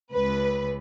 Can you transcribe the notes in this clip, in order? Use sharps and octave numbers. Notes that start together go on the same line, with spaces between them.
C#2 B4